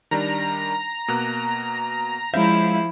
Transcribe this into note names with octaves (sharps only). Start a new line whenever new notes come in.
D#3 G3 D4 A#5
B2 A#3 F#6
F3 G#3 C#4 E4 C5 E5 F5 G6